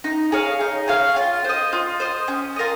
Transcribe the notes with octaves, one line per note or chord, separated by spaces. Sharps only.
D#4
G#4 C#5 F5
D#4
G#4 C#5 F5
F4
C5 D#5
F4
C5 D#5
C#4
F4 A#4 D#5